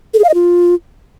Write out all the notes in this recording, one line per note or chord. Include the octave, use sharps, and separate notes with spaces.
A4
G#4
F5
D#5
F4